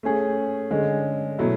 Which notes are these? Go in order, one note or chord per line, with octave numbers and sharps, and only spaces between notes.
A3 C#4 G#4
D3 G#3 C#4
B2 F#3 A3 E4